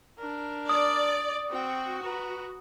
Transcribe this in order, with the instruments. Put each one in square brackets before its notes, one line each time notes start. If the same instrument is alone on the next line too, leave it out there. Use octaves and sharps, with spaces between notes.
[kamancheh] D4 A#4
[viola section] D5 [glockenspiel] D#6
[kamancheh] C4 G5 [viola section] F#4
[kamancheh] B4 A#5